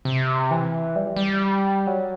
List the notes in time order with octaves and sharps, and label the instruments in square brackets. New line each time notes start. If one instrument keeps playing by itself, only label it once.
[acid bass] C3
E3
G3
G3
F#3